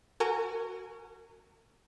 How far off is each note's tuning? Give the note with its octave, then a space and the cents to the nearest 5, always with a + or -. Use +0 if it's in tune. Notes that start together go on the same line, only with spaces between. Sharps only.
F#4 +5 A#4 -35 G#5 +0